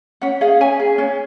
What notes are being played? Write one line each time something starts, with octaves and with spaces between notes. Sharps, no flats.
C#4 F#5
G#4 F5
C#4 G#5
G#4
C#4